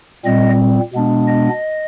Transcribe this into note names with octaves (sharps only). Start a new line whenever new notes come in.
A#2 G3 C4 D#5
B2 G#3 B3 D4
D#5